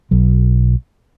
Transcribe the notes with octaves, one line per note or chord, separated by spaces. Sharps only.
B1 F#3